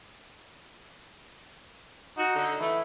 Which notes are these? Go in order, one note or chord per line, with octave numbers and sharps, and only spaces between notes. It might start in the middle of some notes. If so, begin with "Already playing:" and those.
D#4 F#4
D3
E3 A3 E4